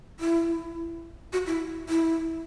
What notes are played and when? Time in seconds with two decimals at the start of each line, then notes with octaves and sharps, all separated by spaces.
0.20 E4
1.33 F#4
1.47 E4
1.89 E4